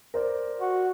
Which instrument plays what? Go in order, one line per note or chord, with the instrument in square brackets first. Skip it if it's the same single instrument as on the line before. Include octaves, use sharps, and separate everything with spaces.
[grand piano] A#4 C5 D5
[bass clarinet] F#4